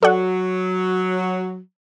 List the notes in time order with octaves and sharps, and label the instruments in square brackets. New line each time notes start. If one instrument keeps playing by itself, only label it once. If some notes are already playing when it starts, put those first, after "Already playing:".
[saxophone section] F#3 [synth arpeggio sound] A4 D5 F#5